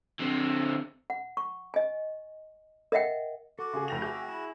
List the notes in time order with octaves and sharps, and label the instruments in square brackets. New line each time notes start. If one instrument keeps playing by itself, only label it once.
[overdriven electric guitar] D3 C4
[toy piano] F#5
C#6
D#5 G#5
A#4 D#5 E5 F#5 G5
[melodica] F#4 [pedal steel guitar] A4 [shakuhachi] D6
[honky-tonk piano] C#3 G#4
[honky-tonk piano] F1 A#6 F7 [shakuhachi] G5
[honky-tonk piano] G#4 [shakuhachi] E5 [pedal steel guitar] G5 D6 G6
[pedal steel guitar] E4 [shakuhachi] B5